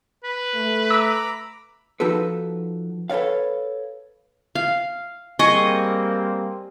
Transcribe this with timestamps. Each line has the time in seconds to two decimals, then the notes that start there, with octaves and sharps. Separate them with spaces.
0.24 B4
0.55 A3
0.90 A#5 B5 D6 E6
2.00 F3 D#4 F#4 A4 B4
3.10 A4 B4 C#5 D5 F5
4.55 F5
5.39 G3 A#3 C4 G#4 D#5 C#6